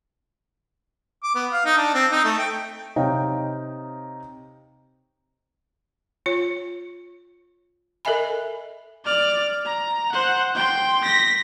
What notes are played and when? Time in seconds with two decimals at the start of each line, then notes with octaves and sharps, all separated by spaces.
1.23 D6
1.35 B3
1.53 F5
1.65 D#4
1.77 D4
1.94 C4
2.12 D#4
2.25 A3
2.38 G5
2.96 C3 D#4 C#5 D#5 F5 G5
6.26 F4 C#5
8.05 A4 A#4 D#5 E5 G#5 B5
9.05 D5 F6
9.66 A#5
10.12 C5 F#5
10.55 G5 C6
11.04 A#6 B6